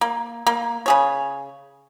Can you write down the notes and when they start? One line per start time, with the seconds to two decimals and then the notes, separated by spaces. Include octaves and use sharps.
0.01 A#3
0.47 A#3
0.86 C#3 G#4 C#5